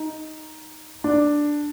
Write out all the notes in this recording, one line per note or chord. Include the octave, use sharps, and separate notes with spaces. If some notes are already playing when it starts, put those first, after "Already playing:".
Already playing: D#4
D4